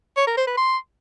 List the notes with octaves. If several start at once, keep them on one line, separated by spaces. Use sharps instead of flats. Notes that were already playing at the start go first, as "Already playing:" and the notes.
C#5
A#4
C5
B4
C6